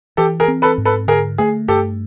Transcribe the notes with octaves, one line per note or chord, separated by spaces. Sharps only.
E3 G4 A4
G#4 A#4
C4
A4 B4
G#2
A4 B4
D3 G#4 A#4
A3 G#4
G2 G4 A4